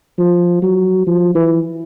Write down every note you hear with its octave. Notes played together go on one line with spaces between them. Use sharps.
F3
F#3
F3
E3